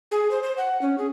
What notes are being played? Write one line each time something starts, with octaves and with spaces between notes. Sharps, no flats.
G#4
C5
C5
F#5
C#4
G#4